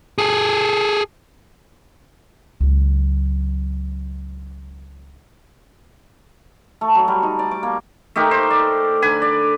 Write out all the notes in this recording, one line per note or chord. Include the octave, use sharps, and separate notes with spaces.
G#4 A4
C#2 F#3
A3
F#3
G3
D#4
D5
D6
A#3
A3 D#4 G4 A#4
C5
D5
D3 B4 G#5
D5